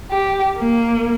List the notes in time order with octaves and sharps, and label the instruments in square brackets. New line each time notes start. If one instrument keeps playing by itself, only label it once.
[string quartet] G4
A#3